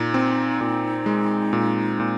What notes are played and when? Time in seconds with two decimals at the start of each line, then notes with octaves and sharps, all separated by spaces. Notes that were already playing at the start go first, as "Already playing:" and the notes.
Already playing: A#2 D#4
0.14 C4
0.61 A#2
1.06 G#3
1.53 A#2
2.00 A#2